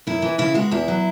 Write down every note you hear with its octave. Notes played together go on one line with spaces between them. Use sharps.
F#2 E4
E3
C#3 E4
G#3 F#4
E2 E4
F#3